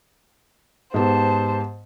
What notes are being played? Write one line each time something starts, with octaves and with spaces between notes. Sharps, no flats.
G#2 B3 G4 C5 A5